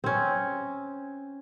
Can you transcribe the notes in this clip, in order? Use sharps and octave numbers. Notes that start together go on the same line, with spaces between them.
C4 C#4